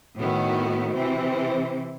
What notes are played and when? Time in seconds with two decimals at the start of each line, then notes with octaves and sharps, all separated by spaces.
0.17 A2 D#3 B3 F#4
0.93 C3 E3 C4